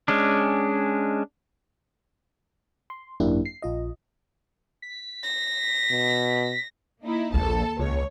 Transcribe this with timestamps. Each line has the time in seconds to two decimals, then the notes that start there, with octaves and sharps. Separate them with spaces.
0.08 G#3 C#4 D4
2.90 C6
3.20 G#1 F#2 A#3 D4 E4 G4
3.45 C7
3.62 A#1 F4 D#5
4.82 B6
5.23 A#6
5.91 B2
7.02 A#3 D#4 E4
7.34 A#1 D#2 A#3 A4 A5
7.79 C#2 C#5